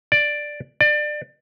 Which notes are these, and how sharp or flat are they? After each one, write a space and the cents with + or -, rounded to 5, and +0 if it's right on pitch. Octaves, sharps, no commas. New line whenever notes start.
D5 +5
D5 +25